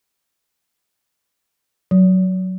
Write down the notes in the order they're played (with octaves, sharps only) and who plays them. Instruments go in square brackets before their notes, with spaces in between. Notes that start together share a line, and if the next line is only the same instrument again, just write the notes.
[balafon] F#3